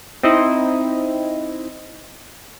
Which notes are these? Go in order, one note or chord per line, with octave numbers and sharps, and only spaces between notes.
C4 D#4 E4 D#5